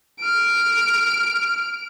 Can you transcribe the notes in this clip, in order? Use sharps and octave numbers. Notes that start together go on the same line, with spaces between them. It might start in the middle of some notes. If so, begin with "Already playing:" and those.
F6 D7